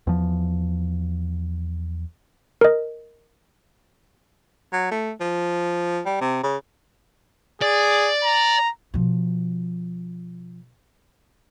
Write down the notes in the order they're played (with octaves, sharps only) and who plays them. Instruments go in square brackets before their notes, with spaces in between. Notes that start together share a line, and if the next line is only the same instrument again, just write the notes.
[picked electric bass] E2 F3
[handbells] A#4 D#5
[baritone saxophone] F#3
A3
F3
G3
C3
C#3
[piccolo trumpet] G#4 [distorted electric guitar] D5
[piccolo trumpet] A#5
[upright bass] B2 F3